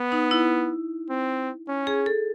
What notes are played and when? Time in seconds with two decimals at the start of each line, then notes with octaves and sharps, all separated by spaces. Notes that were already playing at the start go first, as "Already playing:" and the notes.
Already playing: B3
0.12 D#4
0.31 E4
1.10 C4
1.68 C#4
1.87 G#4
2.06 A4